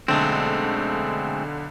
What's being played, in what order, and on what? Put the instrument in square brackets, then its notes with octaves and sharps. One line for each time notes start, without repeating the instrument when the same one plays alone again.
[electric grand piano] B1 D3 [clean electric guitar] G#3 A3 C4